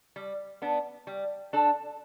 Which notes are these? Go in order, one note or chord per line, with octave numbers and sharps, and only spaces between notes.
G3
B3 D4
G3
D4 A4